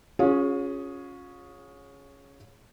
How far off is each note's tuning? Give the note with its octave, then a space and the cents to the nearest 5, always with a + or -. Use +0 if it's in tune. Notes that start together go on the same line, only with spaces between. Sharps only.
C#4 +0 F4 +40 G#4 +0